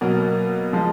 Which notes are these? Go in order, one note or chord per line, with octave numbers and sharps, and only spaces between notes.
B2 F#3 A#3 A#4
F3 G#3